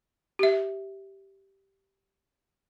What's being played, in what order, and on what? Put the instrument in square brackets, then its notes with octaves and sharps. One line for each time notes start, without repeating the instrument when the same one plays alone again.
[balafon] G4 E5